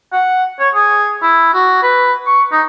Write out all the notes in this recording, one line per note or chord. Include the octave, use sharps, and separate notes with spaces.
F#5
C#5
G#4
E4
F#4
B4
C#6
D#4